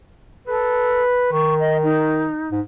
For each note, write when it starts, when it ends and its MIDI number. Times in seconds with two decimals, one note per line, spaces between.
0.47 1.02 69
0.47 1.31 71
1.32 2.27 51
1.32 1.54 85
1.59 1.77 75
1.83 2.49 63
2.52 2.60 44